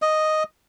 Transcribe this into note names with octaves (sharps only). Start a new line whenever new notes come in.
D#5